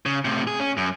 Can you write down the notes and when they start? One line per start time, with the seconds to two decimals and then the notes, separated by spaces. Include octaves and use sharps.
0.06 C#3
0.25 A2 C3
0.47 G#4
0.60 C#4
0.77 F#2